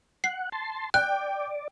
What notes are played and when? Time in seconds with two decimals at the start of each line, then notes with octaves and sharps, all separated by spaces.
0.24 F#5 C7
0.52 A5 C6
0.94 D5 G5 F#6